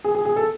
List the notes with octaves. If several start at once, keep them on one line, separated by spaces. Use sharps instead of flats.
G#4
G#4
G#4
A4